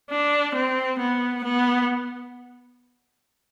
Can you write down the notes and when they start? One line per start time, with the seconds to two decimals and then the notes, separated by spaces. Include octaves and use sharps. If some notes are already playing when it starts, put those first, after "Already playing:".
0.10 D4
0.55 C4
0.99 B3
1.44 B3